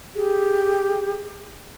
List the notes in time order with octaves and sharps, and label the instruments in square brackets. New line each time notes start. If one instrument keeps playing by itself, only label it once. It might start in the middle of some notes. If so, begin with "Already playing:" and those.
[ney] G4 [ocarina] G#4